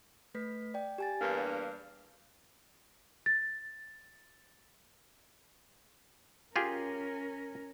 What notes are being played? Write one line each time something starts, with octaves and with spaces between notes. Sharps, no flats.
A3 B4 B6
D5 G5
G4 G#5 A6
E2 G2 A#3 D4
A6
C#4 F4 G4 G#4 A#4